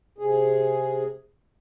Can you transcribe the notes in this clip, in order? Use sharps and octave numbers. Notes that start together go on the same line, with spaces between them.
C3 G#4